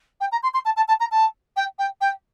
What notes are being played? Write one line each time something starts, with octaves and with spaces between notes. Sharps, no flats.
G5
A#5
C6
C6
A5
A5
A5
A#5
A5
G5
G5
G5